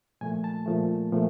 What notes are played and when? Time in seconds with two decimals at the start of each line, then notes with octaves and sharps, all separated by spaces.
0.21 A#2 F3 A3 G#5
0.44 A5
0.66 A#2 F3 A3
1.12 A#2 F3 A3